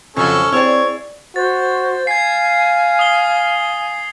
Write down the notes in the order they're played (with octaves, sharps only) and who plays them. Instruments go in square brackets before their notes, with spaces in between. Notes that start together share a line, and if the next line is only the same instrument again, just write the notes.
[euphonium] F2 [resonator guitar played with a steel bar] C#3 F#3 [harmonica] C#4 A4
[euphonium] C4 [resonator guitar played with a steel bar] E4 G#4 D5 [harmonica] C#5
[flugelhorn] F#4 [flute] C5 [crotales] A6
[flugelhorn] F5 [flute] G#5 [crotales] G#6 C7
[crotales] D#6 C7 G7